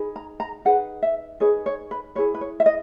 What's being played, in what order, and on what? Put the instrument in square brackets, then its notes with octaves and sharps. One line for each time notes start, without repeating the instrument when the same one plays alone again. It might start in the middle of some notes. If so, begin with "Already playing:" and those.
Already playing: [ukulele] D#4 G#4 B4
A#5
A#5
D#4 G#4 B4 F#5
E5
D#4 G#4 B4 C#5
C#5
B4
E4 G#4 B4 C#5
B4
C#5
E5
D#5